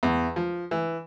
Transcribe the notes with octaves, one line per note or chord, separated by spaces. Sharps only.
E2
F3
E3